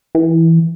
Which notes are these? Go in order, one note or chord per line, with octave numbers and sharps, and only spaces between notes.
E3